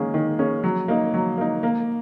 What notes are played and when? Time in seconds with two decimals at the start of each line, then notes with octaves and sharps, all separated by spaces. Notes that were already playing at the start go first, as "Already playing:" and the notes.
Already playing: D#3 A#3 C#4 G#4
0.14 D#3
0.39 A#3 C#4 G#4
0.64 F#3
0.88 A#3 D#4
1.14 F#3
1.38 A#3 D#4
1.63 A#3